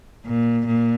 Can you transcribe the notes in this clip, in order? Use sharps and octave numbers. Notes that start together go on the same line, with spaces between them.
A#2
A#2